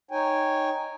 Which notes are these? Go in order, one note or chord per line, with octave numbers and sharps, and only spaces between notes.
D#4 C#5 G5 G#5